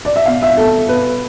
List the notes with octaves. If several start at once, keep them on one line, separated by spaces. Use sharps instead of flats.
D5
E5
B2 F5
E5
B2 A4
B2 B4